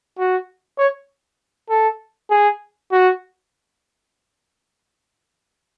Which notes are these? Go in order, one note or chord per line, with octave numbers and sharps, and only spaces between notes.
F#4
C#5
A4
G#4
F#4